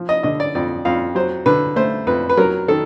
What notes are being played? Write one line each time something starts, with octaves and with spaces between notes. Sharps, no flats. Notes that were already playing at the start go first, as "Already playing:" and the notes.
Already playing: F3
D#5
D3 D#5
D5
F2 D5
F2 F5
F#3 C5
D3 B4
A3 C5
F2 B4
B4
F#3 A#4
D#3 A4